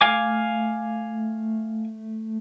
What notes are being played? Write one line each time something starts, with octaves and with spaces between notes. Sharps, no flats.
A3 F5 G#5 D6